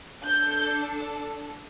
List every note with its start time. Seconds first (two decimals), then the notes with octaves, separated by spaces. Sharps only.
0.25 D4 A4 G6